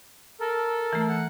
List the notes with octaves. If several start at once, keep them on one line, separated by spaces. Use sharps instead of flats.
A4 A#4
E3 A3
F#5